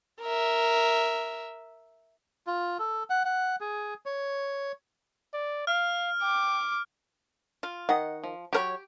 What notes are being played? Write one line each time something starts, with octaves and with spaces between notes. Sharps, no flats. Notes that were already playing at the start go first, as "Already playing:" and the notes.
A#4 E5
F4
A4
F#5
F#5
G#4
C#5
D5
F5 F6
G5 D6
F4
D#3 D#5 F#5
F3
F#3 G4 A#4 C#5 B5